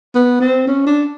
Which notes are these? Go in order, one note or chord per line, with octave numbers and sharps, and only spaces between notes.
B3
C4
C#4
D4